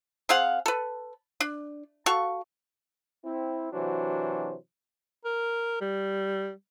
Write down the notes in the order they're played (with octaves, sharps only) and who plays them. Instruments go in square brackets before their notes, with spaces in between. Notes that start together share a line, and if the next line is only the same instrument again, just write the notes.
[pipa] C4 G#4 F5 F#5
A4 B4
D4
F#4 A4 F5 C#6
[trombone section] C4 E4
C3 E3 F#3 D4 F#4 C5
[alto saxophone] A#4
G3